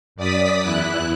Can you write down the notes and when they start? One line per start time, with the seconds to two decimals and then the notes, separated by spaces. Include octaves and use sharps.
0.16 F#2 D5 D#6 B6
0.62 E2 E4 F#6